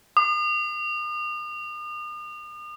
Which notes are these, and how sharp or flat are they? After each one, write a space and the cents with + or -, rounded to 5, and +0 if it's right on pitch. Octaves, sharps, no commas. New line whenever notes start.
D#6 -45